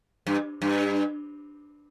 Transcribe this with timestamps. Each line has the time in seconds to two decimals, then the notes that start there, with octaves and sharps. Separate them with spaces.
0.27 G2
0.62 G2